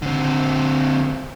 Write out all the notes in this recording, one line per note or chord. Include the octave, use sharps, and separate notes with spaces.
D3 C4